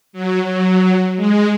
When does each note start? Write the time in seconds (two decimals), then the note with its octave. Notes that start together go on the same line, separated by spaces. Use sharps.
0.13 F#3
0.44 F#3
1.17 G#3